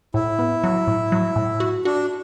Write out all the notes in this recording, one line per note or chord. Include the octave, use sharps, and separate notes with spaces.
A2 E4
B3
F#3
A2
F#3
A2
F#4
D4 F#4